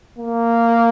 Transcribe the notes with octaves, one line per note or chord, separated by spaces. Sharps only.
A#3